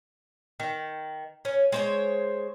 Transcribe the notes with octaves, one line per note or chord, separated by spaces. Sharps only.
D#3
C#4
G#3 C5 C#5